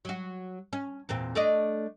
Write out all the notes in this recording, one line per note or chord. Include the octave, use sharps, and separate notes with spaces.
F#3 F#4
C#4
E2 A#2 C4
A3 D4 D#5